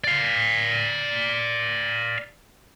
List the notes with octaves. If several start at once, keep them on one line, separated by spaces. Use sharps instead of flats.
D5 F5